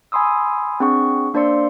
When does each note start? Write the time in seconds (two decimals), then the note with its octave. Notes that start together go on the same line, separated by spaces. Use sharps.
0.12 G#5 B5 C6 D#6 E6
0.80 C4 D4 G#4 F#5 C#6
1.34 A#3 D4 C5 D5 C6 C#7